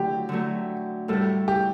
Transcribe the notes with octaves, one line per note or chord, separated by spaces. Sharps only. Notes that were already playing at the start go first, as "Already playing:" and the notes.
Already playing: D3 F#3 A3 G4
D3 F#3 A3
A2 G3 D4 A4
G4